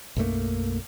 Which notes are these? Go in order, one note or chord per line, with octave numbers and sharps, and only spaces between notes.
B1 F#2 A3 A#3